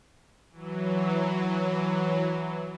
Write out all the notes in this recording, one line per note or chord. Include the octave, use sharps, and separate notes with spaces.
E3 F#3